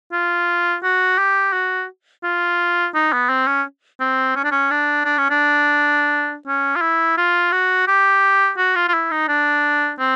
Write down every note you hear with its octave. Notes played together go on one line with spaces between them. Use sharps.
F4
F#4
G4
F#4
F4
D#4
B3
C4
C#4
C4
C#4
D4
C#4
D4
D4
C#4
D4
C#4
F4
E4
F4
F#4
G4
F#4
F4
F4
E4
D#4
D4
C4